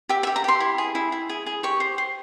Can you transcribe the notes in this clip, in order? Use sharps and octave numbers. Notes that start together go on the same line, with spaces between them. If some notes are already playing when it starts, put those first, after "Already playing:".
G4 E5
E5
G4
A#5
G4 C6
E4
G#4
E4
E4
G#4
G#4
G4 C#6
C5
C5